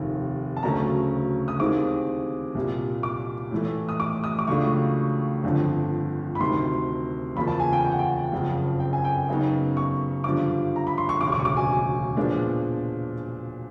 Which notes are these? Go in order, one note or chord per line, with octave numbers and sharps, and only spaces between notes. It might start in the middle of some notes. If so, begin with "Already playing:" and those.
Already playing: F1 D#2 D#3
A5
D2 C#3 F#3 A3 C#4 A#5
D#6
D#2 D#3 G#3 C4 E4 D6
C2 A#2 G3
D6
A2 E3 A3
D#6
D6
D#6
D6
C#2 C#3 F#3 A3 D4 C#6
G1 F2 D3
B5
D2 C3 D#3 C6
E2 C#3 F3 A#3 B5
A5
G#5
G5
G5
F#5
G5
F#1 F2 C#3 F3
G5
G#5
G5
F#2 C#3 F#3 B3 D#4
C#6
G2 D3 F3 D6
A#5
B5
C6
C#6
E1 D2 C#3 D6
C#6
D6
C#6
D6
G#5
A#2 F3 G#3 B3 D4